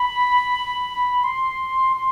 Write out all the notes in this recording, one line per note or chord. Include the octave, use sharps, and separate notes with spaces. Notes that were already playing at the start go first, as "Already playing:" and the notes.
Already playing: B5
C6
C6